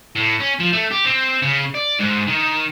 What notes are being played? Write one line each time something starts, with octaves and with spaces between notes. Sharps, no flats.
A2
C#4
F3
A3
G4
C4
C#3
D5
G#2
D#3